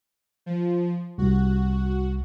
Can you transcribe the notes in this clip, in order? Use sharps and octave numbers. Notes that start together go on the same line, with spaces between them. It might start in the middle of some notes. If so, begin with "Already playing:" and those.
F3
C2 F#4